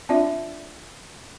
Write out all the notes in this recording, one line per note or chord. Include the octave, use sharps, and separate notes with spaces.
C4 D4 F4 D5 E5